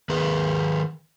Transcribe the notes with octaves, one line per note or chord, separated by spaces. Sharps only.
D#3 G#4 B4